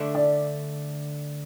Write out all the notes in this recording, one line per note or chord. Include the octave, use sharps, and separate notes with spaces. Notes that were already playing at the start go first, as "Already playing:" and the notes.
Already playing: D3 A3 D4
D5